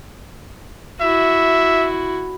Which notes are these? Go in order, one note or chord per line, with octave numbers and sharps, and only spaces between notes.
E4 F#4 E5